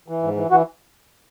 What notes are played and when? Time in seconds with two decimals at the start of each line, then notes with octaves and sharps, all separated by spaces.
0.08 E3
0.23 G#2
0.36 E3
0.51 E3 F#4